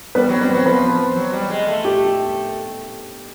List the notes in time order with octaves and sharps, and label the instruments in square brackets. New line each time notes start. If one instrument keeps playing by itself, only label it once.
[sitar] G3 [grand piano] B3 B4
[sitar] F#3
[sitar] G3 [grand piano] C4 C5
[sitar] F#3
[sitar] F3 [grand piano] B3 B4
[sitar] F#3
G3
G#3
A3
[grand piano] G4